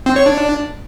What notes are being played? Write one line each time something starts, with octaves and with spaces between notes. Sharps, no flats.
C4
C#5
D4